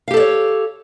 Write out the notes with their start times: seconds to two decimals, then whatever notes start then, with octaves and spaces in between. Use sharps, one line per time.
0.08 F5
0.11 G4
0.14 A4
0.17 D5
0.20 C#5